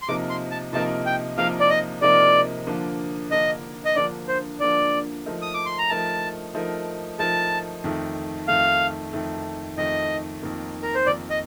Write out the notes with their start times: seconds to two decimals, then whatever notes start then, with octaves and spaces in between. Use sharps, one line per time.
0.02 C6
0.08 C3 F3 A#3 D#4 A#4 D6
0.30 C6
0.51 A5
0.73 C3 F3 A#3 D#4 A#4 A5
1.06 G5
1.37 C3 F3 A#3 D#4 A#4 F5
1.60 D5
1.69 D#5
2.02 C3 F3 A#3 D#4 A#4 D5
2.67 D3 F3 A#3 D4
3.31 D3 F3 A#3 D4 D#5
3.85 D#5
3.96 D3 F3 A#3 D4 D5
4.28 C5
4.60 D3 F3 A#3 D4 D5
5.25 F3 A3 D#4 A#4
5.42 D#6
5.54 D6
5.66 C6
5.78 A#5
5.89 F3 A3 D#4 A#4 A5
6.55 F3 A3 D#4 A#4
7.19 F3 A3 D#4 A#4 A5
7.84 F2 D#3 A3
8.48 F2 D#3 A3 F5
9.13 F2 D#3 A3
9.77 F2 D#3 A3 D#5
10.43 F2 D#3 A#3
10.82 A#4
10.95 C5
11.06 F2 D#3 A#3 D5
11.30 D#5